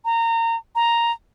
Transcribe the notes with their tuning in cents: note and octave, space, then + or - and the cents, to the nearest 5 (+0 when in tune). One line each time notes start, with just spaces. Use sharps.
A#5 -25
A#5 +5